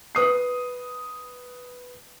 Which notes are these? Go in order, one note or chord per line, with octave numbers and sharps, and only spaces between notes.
B4 D#6 C7